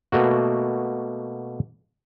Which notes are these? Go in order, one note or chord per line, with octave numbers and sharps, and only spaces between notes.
B2 A3 A#3 F#4